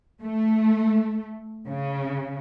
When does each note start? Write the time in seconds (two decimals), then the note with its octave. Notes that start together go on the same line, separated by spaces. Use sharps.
0.23 A3
1.68 C#3